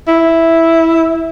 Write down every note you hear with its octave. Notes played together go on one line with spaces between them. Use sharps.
E4